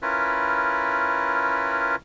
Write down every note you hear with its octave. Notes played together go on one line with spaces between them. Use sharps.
C#4 E4 F4 A#4 B4